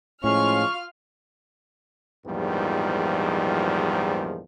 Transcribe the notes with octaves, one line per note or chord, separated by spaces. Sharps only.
A2 F3 G#3 C#4 F4 F5 C#6 F6
A#1 E2 G#2 D#3 F3 G3